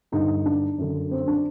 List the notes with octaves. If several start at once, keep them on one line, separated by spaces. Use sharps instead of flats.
G2 D3 D#4
D4
F#2 D3
C4
D4